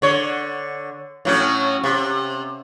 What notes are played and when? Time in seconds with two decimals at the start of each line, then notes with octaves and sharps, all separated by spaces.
0.02 D3 C#5
1.25 A2 F#3 C#4
1.84 C3